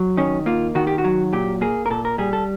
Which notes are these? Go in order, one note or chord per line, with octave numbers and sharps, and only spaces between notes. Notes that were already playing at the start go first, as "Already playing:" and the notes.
Already playing: F#3
D#3 C#4
A#3 F4
D#3 F#4
G4
F#4
F#3
A#2 G4
A#3 G#4
A#4
A#2 A4
A#4
G3 G#4
A4